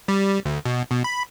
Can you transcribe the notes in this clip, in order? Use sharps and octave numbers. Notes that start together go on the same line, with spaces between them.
G3
D2
B2
B2
B5